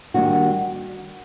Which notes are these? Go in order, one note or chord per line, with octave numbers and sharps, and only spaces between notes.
D#3 G3 A#3 D4 F#4